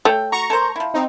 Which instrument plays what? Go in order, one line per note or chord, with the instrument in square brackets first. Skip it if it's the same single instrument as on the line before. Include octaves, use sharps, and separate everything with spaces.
[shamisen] A3 [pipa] A4 C#5 G5
[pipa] F#4 [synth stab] A#5 C#6
[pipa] A4 A#4 C5
F3 E4
[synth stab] C4 D#4